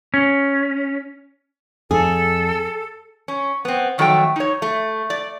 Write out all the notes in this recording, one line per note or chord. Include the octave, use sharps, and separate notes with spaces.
C#4
F2 G#4 A4
C#4
B3 C4
F2 D#3 F#3 A3 E5 G5
D#4 C#5
A3
D5